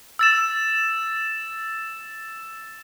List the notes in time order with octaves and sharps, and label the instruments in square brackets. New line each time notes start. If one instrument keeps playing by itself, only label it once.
[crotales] E6 A6 E7